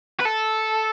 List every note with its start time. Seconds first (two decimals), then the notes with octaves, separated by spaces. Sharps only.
0.20 B4
0.25 A4